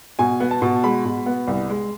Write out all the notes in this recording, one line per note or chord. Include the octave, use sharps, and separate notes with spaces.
B2 G#5
B3
A5
B2
G#3 B5
B2
B3
C2
G#3